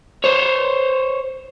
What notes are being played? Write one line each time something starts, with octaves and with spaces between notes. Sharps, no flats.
C5 C#5